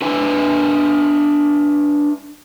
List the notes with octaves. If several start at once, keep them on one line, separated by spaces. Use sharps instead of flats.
D4 B4 E5 G#5